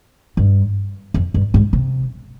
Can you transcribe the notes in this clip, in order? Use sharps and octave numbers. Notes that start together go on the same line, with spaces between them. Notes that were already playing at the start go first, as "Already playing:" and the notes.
G2
F2
G2
G#2
C3